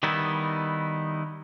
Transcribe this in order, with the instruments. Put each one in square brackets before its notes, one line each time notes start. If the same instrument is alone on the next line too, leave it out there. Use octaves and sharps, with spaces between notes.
[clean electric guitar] D#3 G3 B3 D#4 E4